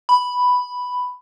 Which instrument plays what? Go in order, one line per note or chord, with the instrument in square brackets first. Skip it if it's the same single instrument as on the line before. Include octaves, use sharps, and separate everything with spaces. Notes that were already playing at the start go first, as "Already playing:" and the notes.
[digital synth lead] B5